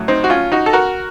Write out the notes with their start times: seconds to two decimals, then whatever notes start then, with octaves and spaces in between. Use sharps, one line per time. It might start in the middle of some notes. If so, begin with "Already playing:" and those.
Already playing: A2 F#3
0.08 C4 D#4
0.24 F#4
0.30 C#4 F4
0.52 D#4 F#4
0.66 A4
0.73 F#4 A#4